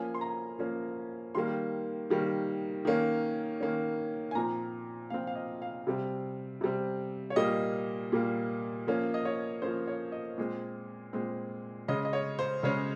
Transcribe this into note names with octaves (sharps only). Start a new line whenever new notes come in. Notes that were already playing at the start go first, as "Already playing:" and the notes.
Already playing: F3 A#3 C#4 G#5
C6
A#5
F3 A#3 C#4
D#3 G3 A#3 C6
D#3 G3 A#3
D#3 A#3 C#4
D#3 A#3 C#4
G#5
A#2 F3 C4 A#5
A#2 F3 C4 F5
F5
D#5
F5
C3 G3 C4
C3 G3 C4
C#5
A#2 G3 A#3 D#5
A#2 G3 A#3
F3 A#3 C#4
D#5
C#5
F3 A#3 C#4 C5
C#5
D#5
A#2 G#3 C4
A#2 G#3 C4
C#3 G#3 C#4 D#5
D#5
C#5
C5
C#3 G#3 C#4 C#5